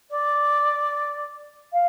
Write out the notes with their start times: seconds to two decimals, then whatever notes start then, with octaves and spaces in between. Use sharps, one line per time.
0.10 D5
1.73 F5